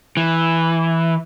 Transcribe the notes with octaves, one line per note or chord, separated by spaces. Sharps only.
E3